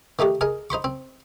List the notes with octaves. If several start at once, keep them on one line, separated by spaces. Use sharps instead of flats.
D#3 A3 D#4 G4
G#4 A#4 D#5
D#4 C5 B5 C#6
C4